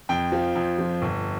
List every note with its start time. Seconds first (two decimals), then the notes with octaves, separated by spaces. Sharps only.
0.09 F2 G5
0.32 F3
0.55 F2
0.79 F3
1.02 G1